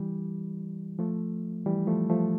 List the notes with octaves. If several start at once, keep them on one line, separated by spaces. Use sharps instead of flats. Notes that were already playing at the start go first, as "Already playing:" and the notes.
Already playing: E3 G3
F3 A3
E3 G3
F3 A3
F3 A3